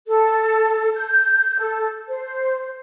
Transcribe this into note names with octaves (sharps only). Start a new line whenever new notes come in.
A4
G6
A4
C5